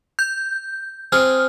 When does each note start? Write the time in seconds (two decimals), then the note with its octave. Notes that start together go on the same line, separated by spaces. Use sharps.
0.19 G6
1.12 C4 G#4 F6